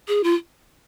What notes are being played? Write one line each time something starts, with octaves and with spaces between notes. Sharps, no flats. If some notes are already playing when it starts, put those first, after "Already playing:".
G#4
F4